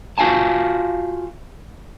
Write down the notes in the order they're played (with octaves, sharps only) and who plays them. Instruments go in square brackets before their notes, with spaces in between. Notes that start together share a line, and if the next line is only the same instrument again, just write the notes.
[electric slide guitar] F4 F#4 F5 G#5 A5